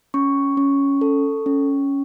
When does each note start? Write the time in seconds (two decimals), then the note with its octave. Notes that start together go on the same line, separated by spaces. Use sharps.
0.14 C#4 C#6
0.57 C#4
1.01 A4
1.46 C#4